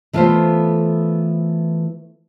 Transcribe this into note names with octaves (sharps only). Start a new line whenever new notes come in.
E3 A3 B3 F4 A4 C5